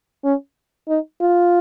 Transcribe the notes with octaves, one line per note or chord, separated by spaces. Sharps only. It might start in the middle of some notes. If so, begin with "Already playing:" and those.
C#4
D#4
F4